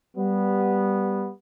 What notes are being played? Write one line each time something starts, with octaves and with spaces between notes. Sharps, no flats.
G3 B3